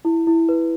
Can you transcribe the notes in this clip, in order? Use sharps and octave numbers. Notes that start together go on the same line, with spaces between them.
E4
E4
B4